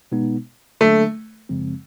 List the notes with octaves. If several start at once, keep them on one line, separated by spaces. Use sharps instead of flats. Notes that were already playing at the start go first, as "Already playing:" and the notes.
B2 G#3 B3 D#4
D3 F#3 A3 A#3 D4
F#2 C#3 F3 G#3 C4